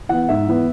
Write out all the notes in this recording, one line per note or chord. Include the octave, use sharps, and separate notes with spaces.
E3 B3 F#5
G#2 E5
E3 B3